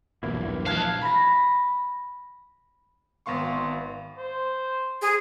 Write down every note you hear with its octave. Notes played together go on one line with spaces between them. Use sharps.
B1 E2 G2 E3 A#3 E4
A#1 G#3 F5 A5 F#6 G#6
B5 A#6
G#1 B3 F5 C6 C#6
C5
G#4